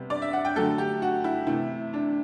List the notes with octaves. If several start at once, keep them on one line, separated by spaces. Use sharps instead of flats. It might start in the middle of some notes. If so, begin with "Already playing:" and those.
Already playing: C3 G3 B3
D5
E5
F#5
G5
D3 F#3 A3 A4
G4
F#4
E4
C3 E3 A3 E4
D4